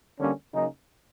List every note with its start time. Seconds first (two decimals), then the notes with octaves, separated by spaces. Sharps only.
0.20 D3 G3 A#3 C#4
0.53 C#3 F#3 A#3 D#4